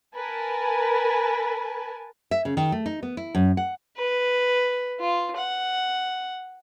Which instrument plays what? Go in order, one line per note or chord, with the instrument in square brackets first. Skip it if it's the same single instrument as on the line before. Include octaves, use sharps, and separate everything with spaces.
[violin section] A#4 B4 G#5 A5
[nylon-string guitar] E5
C#3
D#3
A3
D#4
B3
E4
F#2
F#5
[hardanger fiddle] B4
F4
F#5